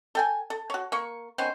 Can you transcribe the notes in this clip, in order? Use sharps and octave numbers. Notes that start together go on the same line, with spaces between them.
A4 G5 G#5
A4
F#4 C#5
A#3 C#6
D#3 B3 C#4 C5